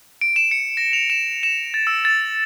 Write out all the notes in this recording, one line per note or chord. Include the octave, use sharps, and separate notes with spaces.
D7
E7
C#7
A#6
F7
E7
E7
A6
E6
A6